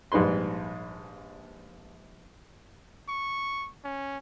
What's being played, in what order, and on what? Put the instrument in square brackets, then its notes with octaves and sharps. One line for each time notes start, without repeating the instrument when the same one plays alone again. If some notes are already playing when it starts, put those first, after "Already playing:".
[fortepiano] A#1 G#2 G3 B4 C6
[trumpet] C#6
C#4